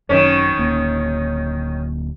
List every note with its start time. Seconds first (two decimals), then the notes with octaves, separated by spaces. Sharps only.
0.09 G#1 F#2 D#3 C#4
0.57 D1 A#3